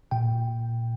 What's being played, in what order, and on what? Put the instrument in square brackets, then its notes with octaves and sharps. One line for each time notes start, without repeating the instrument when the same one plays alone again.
[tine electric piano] A#2 G5